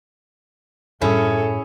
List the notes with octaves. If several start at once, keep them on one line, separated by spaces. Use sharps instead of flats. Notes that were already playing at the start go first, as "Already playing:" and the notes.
F#2 A2 G3 C#4 E4 G#4 A4